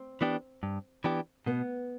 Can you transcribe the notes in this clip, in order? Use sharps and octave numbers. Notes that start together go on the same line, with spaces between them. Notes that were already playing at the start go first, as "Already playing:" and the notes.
Already playing: C4
E3 B3 D4 G4
G2
E3 B3 D4 G4
B2 B3